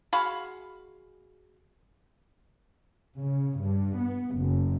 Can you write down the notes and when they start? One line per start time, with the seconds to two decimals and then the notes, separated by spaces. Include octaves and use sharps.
0.13 G#3 F#4 F5 B5
3.17 C#3
3.59 G2
4.00 B3
4.37 F#1